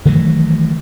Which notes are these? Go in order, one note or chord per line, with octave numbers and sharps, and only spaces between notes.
D#3 E3 F#3 A3